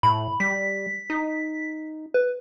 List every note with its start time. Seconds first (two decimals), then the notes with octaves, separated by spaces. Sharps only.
0.03 A2 B5
0.40 G3 B6
1.10 D#4
2.14 B4